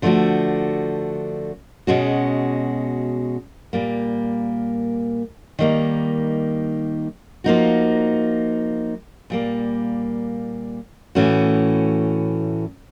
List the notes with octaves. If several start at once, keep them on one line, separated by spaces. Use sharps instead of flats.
D3 F3 A3 D4 F#4
B2 G#3 C#4 F#4
A#2 G3 A#3
D#3 G3 A#3 D#4
F3 A#3 D#4 F#4
A#2 G3 A#3
A2 E3 A3 C#4 F#4